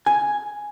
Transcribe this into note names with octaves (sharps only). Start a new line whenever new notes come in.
G#5